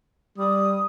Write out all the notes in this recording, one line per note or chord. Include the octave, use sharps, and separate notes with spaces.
G3 D#6